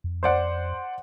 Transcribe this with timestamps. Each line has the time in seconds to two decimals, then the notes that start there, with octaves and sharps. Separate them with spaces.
0.04 F2
0.23 C5 D5 F#5